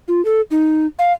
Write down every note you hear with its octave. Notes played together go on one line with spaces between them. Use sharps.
F4
A4
D#4
F5